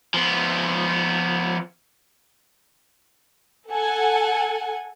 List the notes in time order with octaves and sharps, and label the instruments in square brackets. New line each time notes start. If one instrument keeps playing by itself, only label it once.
[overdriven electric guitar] F3 B3
[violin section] A4 F#5 G#5